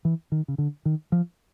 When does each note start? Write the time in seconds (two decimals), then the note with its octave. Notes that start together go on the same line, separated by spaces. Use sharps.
0.05 E3
0.32 D#3
0.48 C#3
0.58 D3
0.85 D#3
1.12 F3